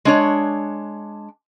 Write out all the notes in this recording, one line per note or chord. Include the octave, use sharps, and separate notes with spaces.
G#3 D4 C#5